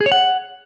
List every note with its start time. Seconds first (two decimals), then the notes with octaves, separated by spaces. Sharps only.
0.01 G#4
0.06 C#5
0.12 F#5